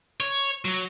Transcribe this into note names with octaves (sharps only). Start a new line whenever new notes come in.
C#5
F#3